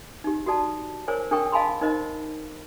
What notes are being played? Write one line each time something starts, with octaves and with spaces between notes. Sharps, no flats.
D#4 G4
F#4 G4 A4 D5 A5
A#4 C5 C#5 G#5
D4 A4 A#4 G5 C#6
D#5 F5 G#5 A5 B5 C6
D#4 A#4 C5 D#5